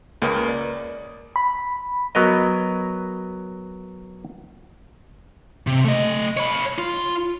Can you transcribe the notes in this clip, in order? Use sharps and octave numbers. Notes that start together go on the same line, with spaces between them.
C#2 A#3 C#4 A#4 B4 D#6
D5
B5
F#3 B3 A#4 D#5
C3
A3 D#5
C#5 B5
F4